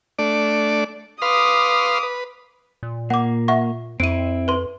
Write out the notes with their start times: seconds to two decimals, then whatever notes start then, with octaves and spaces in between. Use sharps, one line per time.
0.19 A3 D4 D5
1.22 B4 F5 C6 D6 D#6
2.03 B4
2.83 A#2
3.10 A#3 F#5 D6
3.48 E5 F#5 C#6
4.00 F2 C4 E4 D7 D#7
4.48 B4 C6